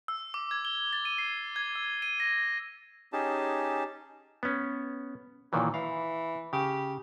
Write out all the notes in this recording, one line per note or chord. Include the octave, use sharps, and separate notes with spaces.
E6
D6
G#6
G7
A6
D#7
C7
G#6
E6
D#7
A#6
C#4 D#4 G4 G#4 A5
B3 C#4
A#2 D#3 E3 F#3
E3 F5
C#3 G4